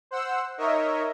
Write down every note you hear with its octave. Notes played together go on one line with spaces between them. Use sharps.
C5 F#5 E6
D#4 A#4 C#5 D#5 E5